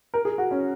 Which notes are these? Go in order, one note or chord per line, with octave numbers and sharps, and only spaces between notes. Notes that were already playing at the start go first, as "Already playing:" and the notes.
A#4
G#4
F#4
C#4